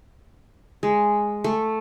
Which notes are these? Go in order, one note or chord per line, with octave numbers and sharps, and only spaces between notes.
G#3
A3